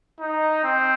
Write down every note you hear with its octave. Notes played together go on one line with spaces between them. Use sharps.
D#4
C4